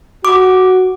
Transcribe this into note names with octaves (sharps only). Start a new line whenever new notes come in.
F#4 D6